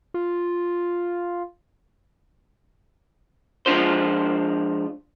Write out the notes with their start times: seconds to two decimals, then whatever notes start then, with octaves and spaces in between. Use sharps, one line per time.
0.14 F4
3.66 F3 G#3 D4 F4 C5